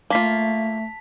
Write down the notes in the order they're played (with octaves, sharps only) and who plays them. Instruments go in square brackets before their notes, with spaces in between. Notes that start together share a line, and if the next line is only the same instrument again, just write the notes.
[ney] A3 [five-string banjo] A#3 F4 [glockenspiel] A5 B6 F7